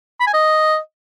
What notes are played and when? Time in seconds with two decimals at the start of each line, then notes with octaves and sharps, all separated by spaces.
0.20 B5
0.27 G#5
0.34 D#5